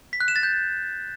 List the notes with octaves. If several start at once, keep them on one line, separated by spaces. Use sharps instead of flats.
B6
F#6
E7
A6
G6